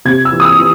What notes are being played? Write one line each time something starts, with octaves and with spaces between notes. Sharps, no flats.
C3 G#6
E6
E3
D#6
E6
E3